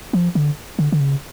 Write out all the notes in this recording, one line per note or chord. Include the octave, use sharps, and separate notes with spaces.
F3
D3
D3
D3
C#3